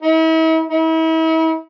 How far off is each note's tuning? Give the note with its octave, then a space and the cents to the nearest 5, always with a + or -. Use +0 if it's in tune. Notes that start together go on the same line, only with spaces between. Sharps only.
E4 -45
E4 -40